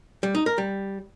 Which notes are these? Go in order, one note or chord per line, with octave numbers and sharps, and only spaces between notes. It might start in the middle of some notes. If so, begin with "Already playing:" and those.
G3
D#4
A#4
G3